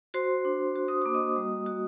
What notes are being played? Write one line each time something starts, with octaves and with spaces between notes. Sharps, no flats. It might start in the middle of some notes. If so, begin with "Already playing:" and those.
F#4 C5 C6
D4
F#4
D#6
A#3 D6
D#5 D#6
G3
F#4